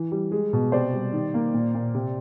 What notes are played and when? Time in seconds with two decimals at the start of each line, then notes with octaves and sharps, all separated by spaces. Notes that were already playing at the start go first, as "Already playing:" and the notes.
Already playing: E3
0.12 G3
0.32 G#3
0.53 B2
0.72 C3 C5 D5
0.93 G3
1.13 D#3
1.34 A#3
1.54 A#2
1.74 A#2
1.95 C3